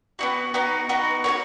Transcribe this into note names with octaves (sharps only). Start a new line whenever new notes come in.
B3 D#4 F#4
B3 D#4 F#4
B3 D#4 F#4
F#4 A#4 C#5